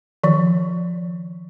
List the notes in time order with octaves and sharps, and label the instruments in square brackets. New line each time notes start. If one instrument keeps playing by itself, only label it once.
[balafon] D#3 F3